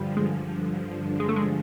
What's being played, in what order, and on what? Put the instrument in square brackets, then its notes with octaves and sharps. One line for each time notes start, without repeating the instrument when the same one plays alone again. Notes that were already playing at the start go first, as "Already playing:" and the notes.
Already playing: [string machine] G2 D3 F3 [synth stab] G3
[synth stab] G#3
G#3
A3
G#3